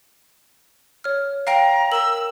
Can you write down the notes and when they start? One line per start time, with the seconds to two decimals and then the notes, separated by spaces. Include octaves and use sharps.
1.04 C#5 F6
1.47 F5 G5 A#5
1.92 A#4 E6 F#7